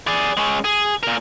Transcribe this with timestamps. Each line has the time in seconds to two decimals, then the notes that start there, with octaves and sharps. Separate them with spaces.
0.07 G#4 D5
0.37 G#3 C#4
0.64 G#4
1.03 A#2 A#4